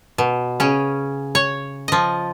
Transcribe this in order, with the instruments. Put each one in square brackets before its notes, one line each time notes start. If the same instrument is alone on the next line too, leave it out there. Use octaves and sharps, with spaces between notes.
[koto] B2
C#3 C#4
C#5
F3 D#5